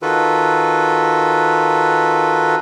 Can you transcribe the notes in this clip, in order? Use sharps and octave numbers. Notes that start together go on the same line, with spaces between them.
D#3 F4 F#4 A4 B4